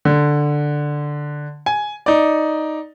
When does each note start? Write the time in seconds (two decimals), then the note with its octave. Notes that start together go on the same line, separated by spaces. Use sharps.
0.05 D3
1.66 G#5
2.06 D#4 D5